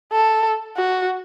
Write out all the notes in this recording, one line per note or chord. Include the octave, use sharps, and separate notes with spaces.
A4
F#4